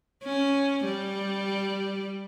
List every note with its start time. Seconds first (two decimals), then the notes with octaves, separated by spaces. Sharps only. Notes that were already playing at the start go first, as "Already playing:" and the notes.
0.24 C#4
0.85 G3